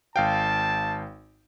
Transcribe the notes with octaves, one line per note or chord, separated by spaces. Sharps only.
G#1 F5 G5 A5